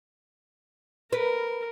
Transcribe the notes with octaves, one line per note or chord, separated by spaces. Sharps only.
A#4 B4